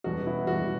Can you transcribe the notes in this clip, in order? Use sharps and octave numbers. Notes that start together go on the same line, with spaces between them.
E2 B2 G3 F#4
E4
E2 B2 G3 F#4